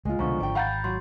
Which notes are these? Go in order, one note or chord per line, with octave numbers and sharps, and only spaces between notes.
C#2 G#3 F4
C2 B2 D3 F3 A#5 C#6
G#1 D5 G5
F5 F#5 A#5 B5 G6 A6
F#3 C6